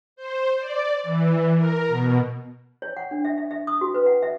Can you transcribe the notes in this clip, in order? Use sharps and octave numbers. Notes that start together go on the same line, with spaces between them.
C5
D5
E3
A#4
B2
C#5
F#5
D4
E5
E5
E5
D#6
F#4
B4
F#5
E5